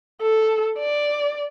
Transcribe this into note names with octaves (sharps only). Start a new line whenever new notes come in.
A4
D5